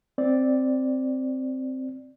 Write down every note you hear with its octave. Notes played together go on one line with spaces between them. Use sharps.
C4 D5